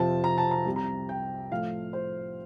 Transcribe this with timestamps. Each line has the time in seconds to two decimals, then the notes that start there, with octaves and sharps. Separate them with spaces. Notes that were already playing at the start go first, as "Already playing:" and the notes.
Already playing: F2 C3 F3 C4 A5
0.24 A#5
0.38 A5
0.51 A#5
0.66 C2 C3 G3
0.76 A#5
1.09 G5
1.51 A2 F3 A3 F5
1.93 C5